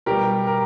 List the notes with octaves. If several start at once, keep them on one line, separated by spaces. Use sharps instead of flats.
B2 G3 G4 A#4
A#4